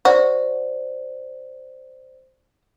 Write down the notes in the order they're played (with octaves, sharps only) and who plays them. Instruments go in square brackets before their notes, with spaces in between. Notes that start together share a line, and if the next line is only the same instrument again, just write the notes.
[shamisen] F#4 [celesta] C5 D5